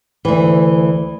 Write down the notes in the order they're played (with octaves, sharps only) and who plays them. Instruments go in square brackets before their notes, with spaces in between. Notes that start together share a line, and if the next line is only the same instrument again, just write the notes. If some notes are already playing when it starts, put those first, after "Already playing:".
[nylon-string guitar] D2 E3